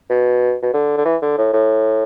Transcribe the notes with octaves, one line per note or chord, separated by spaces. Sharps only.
B2
B2
D3
D3
E3
D3
A2
A2